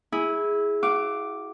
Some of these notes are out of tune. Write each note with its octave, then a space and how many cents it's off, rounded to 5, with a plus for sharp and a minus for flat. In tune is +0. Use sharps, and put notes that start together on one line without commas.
E4 -15 G#4 +0
F#4 +25 F5 -20 D6 +0